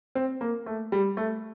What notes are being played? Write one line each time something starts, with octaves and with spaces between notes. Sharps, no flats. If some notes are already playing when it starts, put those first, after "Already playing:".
C4
A#3
A3
G3
A3